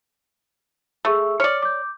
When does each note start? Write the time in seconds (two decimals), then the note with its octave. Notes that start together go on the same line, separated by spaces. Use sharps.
1.05 A3 G#4 C#6 E6
1.40 C#5 D5 F6 C#7
1.62 D6 G6